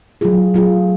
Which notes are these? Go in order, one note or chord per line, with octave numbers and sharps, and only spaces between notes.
F#3 A3 F4 G#4
F#3 A3 F4 G#4